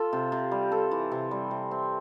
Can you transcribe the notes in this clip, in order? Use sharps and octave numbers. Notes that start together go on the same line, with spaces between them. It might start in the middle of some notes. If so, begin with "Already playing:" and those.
Already playing: F4 A4
C3
C3
G3
A4
E3
C3
G3
C3
C4